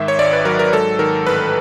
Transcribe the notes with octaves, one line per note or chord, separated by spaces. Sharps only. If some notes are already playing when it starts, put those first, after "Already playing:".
Already playing: G#2 D#3 E5
C#5
G#1 D5
B4
F#3 A#4
A#4
G#2 A4
D#3 A#4
A1 B4